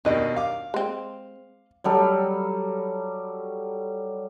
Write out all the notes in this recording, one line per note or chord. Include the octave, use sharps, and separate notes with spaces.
D#2 B2 D#3 D4 D#5
F5 D6
G#3 C4
F#3 G3 A4